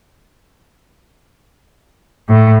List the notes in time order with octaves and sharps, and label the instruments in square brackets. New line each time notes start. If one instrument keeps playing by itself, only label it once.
[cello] A2